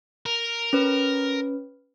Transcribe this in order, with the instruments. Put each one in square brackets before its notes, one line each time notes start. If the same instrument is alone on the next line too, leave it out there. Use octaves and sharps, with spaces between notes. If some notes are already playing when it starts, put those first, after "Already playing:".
[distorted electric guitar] A#4
[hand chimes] C#4 B4